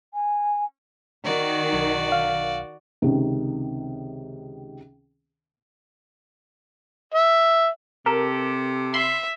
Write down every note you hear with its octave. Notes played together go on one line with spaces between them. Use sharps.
G#5
D#3 F#4 D5
B1
F5
C#2 C3 D#3
E5
C3 G4 A4 A#4
E5 B5 C6